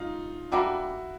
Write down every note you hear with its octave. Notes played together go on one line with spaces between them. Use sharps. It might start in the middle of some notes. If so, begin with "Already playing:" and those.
Already playing: D#4 F4
D3 G3 A#3 E4 F#4